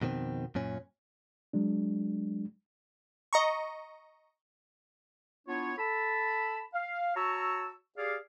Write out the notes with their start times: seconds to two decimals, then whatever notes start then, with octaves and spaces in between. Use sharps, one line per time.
0.02 F2 B2 D#3 C4
0.55 F#2 A#2 C#4
1.53 F#3 G#3 D4
3.33 D#5 A#5 C#6
5.48 B3 D4 E4 F4 C#5
5.78 A4 A5 B5
6.74 F5
7.16 F#4 C#5 A5 A#5 C#6 E6
7.97 G4 G#4 D5 F5